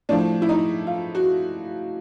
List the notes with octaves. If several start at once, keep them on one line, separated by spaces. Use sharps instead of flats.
A2 F3 D4
E4
D#4
F4
F#4